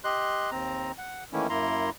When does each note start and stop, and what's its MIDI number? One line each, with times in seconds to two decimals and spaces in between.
0.04 0.50 67
0.04 0.50 75
0.04 0.50 84
0.04 0.50 90
0.51 0.92 39
0.51 0.92 60
0.51 0.92 82
0.98 1.24 78
1.33 1.47 51
1.33 1.47 52
1.33 1.47 57
1.33 1.47 58
1.33 1.47 61
1.33 1.47 64
1.50 1.90 42
1.50 1.90 58
1.50 1.90 64
1.50 1.90 82
1.50 1.90 84